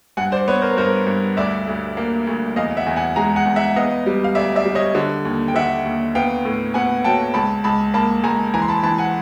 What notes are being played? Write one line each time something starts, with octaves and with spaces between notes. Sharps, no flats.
G2 F#5 G#5
C5 D5
B3 B4 C#5
A#4 C5
G2 A#4 C5
G2
D2 D5 E5
D2
A#3
D2
E2 D#5 F5
E5 F#5
E2
F#5 G#5
G#3 G#5 A#5
F#5 G#5
E2
E5 F#5
B3 D#5 F5
G3
F5
D2 D5 E5
D5 E5
G3
C#5 D#5
D3
D#2
G5
D3 E5 F#5
D#2
B3 F5 G5
A2
B3 F#5 G#5
F#3 G5 A5
C#2 A5 B5
C#2 A5 B5
A#3 A5 B5
C#2 G#5 A#5
E3 G#5 A#5
C6
A5 B5
E3 A5 B5
F#5 G#5